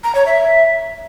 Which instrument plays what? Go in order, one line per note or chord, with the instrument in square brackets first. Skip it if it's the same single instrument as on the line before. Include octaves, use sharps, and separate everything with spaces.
[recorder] A#5
C#5
E5